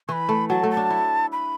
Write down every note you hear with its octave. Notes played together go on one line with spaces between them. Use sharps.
E3 B5 C#6
A3
F#3 A5
A3
A5
D4
E4
B5